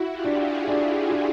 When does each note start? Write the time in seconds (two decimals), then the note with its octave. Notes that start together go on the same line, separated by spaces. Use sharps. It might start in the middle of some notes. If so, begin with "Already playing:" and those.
Already playing: E4 F#4
0.10 F4 G4
0.24 D4
0.39 F#4 G#4
0.67 D4 F#4 G#4
1.11 D4